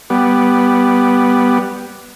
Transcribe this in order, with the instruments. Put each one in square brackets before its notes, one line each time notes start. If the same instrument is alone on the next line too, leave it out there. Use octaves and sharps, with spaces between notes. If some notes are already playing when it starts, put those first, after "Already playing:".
[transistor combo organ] G3 B3